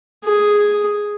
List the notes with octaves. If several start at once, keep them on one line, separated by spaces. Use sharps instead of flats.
G#4